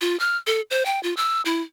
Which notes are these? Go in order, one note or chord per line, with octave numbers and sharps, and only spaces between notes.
F4
F6
A4
C5
G5
F4
E6
E4